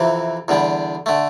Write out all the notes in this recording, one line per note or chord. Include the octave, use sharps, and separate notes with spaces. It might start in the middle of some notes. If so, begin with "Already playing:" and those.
Already playing: F2 C3 E3
E2 D3 G3
D3 A3